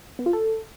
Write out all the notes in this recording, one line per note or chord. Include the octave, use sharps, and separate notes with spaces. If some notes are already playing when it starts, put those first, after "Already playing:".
B3
F4
A4